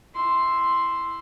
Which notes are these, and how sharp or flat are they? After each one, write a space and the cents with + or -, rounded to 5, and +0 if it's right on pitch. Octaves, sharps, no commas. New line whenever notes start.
E4 +0 C6 +0